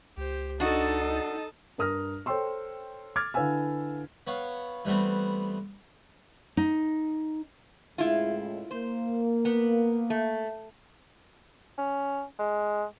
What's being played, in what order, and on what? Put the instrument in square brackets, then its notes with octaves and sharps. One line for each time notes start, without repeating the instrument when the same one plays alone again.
[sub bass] C#2 [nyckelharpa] G4 C5
[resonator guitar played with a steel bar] D4 F#4 [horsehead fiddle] D#4 A4 [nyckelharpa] D#5 A5
[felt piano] G2 A#4 D#6 F6 A#6
A4 C5 C#5 G5 C6 E6
D6 F6 G#6 A6
D3 E4 B4 F5 G#5 E6
[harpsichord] B3 C#5 F5
E3 G3 A3 B3 C4
[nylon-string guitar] D#4
[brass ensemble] C#2 A2 G#3 [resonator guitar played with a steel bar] E4 F4
[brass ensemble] A#3 [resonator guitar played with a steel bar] C5
[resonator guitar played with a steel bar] B3
A3
[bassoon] C#4
G#3